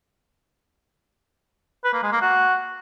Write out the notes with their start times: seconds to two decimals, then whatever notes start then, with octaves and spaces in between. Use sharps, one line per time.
1.84 B4
1.93 A#3
2.03 G#3
2.12 A#3
2.22 F#4